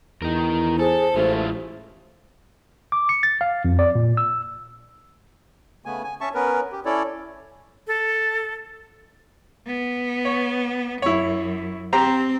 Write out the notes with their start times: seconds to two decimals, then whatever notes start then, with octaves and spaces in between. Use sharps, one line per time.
0.22 E2 D#4 A#4
0.79 G#4 A4 C5
1.16 A1 G#3 A3 E4 F4
2.92 D6
3.09 C#7
3.23 A6
3.41 F5
3.65 F2
3.79 D5
3.95 A#2
4.17 E6
5.85 C#3 A3 B3 G#5
6.04 G#5
6.21 C#4 E5 A5 C#6
6.34 B3 C#4 A#4 B4
6.72 G4
6.85 C#4 E4 A4 C#5 D5
7.87 A4
9.67 B3
10.25 C#5
11.02 F#2 E4 C#5
11.93 C4 G4 C5 A#5